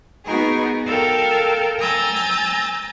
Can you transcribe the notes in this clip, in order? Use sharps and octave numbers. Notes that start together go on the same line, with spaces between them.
B3 D#4 F#4 G#4 A#4
A4 A#4 F5 G5
G#5 A#5 E6 G6 A6